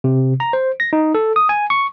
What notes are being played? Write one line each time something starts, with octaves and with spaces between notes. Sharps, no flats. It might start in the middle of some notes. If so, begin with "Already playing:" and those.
C3
A#5
C5
A#6
D#4
A4
D#6
G#5
C#6